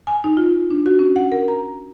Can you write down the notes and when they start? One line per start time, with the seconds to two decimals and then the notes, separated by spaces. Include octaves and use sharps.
0.07 G#5
0.24 D#4
0.37 F4
0.70 D4
0.86 F#4
0.99 C#4
1.16 F#5
1.32 A#4
1.48 A#5